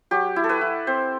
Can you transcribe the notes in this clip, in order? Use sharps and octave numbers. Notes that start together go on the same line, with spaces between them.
F#3 G4
E4
A4
B4
E4
C4 C5